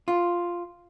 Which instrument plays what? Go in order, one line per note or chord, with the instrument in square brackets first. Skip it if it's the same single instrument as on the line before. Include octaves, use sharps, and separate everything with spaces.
[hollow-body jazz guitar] F4